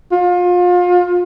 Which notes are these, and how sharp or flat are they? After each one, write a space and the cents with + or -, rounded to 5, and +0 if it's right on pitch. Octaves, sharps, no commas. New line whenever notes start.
F4 +30